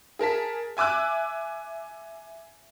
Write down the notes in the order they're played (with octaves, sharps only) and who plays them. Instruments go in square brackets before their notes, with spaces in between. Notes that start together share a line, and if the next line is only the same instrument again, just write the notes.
[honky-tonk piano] G#4 A#4 A5 B6
E5 G#5 D6 E6 F#6